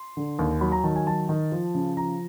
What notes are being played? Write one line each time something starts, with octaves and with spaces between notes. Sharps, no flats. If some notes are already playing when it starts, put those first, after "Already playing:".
Already playing: C6
D3
D#2
F#3 B5
A#5
D#3 A5
G#5
F#3 A5
D#3
F3
C#3
F3 A#5